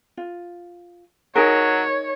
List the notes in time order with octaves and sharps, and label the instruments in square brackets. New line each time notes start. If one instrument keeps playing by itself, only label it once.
[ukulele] F4
[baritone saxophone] F#3 [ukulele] D#4 G#4 A#4 [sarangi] C#5